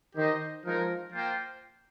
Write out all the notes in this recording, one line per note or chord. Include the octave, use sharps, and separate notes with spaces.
D#3 D#4 G4 C5 D#5
F3 G#3 D#4 A#4
A#3 F4 C5 G5